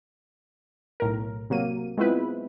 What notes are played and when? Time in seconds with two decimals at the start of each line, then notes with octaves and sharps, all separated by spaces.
1.00 B1 A2 A#4
1.50 C3 F#3 A#3 D#7
1.97 G#3 B3 C4 E4 F4 B4